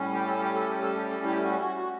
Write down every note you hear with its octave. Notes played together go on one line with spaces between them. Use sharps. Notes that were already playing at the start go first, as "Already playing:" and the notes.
Already playing: A2 G3 C#4
G4
A4
G4
A4
G4
A4
G4
A4
E4 G4
F#4
F#4
F#4